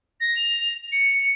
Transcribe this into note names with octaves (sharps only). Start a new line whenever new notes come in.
A#6
F7
C#7